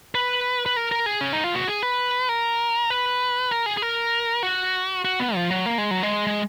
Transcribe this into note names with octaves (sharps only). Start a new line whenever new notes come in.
B4
B4
A#4
A#4
G#4
C#4
D#4
F4
F#4
G#4
B4
A#4
B4
A#4
G#4
G#4
A#4
F#4
F#4
B3
F3
F#3
A#3
G#3
F#3
G#3
G#3